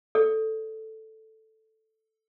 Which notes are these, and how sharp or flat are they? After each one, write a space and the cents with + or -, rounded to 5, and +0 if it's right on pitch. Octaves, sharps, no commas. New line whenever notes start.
A4 +0 D5 -30